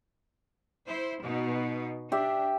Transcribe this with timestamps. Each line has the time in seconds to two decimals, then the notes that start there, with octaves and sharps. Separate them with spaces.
0.87 E4 C5
1.21 B2 D#4
2.12 D4 G4 E5